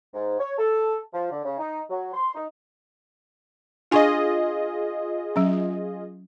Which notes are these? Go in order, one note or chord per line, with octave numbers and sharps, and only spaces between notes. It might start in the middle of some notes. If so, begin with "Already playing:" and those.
G#2
C#5
A4
F3
D3
C#3
D#4
F#3
C6
D#4
D4 F4 G#4 D#5 G#5 C#6
F#3 C#4